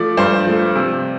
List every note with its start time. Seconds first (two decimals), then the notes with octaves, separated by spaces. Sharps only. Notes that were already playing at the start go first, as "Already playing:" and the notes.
Already playing: F3 A3 D5
0.17 G2 C5
0.46 F3 A3
0.75 C3